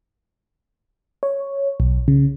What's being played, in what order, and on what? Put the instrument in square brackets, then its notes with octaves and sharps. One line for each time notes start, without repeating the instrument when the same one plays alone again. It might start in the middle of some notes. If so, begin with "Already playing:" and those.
[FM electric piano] C#5
B1
C#3